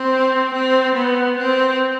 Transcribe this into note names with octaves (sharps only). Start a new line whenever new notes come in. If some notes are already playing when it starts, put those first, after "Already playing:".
Already playing: C4
C4
B3
C4